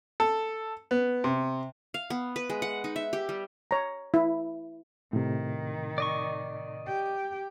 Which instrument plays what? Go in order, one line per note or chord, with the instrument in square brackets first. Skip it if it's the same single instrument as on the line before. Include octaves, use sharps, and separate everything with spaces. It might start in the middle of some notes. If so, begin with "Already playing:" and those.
[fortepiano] A4
B3
C3
[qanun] F5
B3
B4
G#3
F#5
D#4
E5
G4
G3
[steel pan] C#5 A#5
E4
[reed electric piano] A2 C3 [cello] D#3
[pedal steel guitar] D5 D#5 C#6
[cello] G4 G5